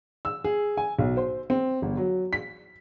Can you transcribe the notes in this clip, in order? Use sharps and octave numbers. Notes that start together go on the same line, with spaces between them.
E6
G#4
G#5
B1
C5
C4
G1
F#3
B6